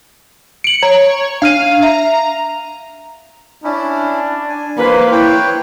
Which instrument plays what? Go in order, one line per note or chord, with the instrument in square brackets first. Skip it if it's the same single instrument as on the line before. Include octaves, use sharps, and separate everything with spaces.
[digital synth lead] C#7 [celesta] D7 F#7
[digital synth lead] C#5 [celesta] A#5
[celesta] D4 F6 D#7 [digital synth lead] F5
[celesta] E5 [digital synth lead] A#5
[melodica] C#4 E4 [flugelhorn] D4
[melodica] G#5
[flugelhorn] A#3 [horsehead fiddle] B4 C5 [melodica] B5
[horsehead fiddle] E4 [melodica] B4 C#5 G5